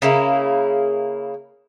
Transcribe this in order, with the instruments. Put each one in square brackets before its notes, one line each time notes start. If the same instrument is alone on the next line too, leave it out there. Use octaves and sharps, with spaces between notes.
[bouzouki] C#3 A#3 E4